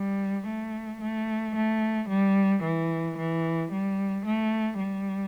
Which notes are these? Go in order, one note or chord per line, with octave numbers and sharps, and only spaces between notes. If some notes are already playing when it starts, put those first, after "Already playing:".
Already playing: G3
A3
A3
A3
G3
E3
E3
G3
A3
G3